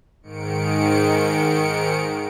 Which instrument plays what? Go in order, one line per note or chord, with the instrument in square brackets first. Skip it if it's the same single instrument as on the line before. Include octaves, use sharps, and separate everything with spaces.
[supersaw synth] G#2 D#3 C#7 D7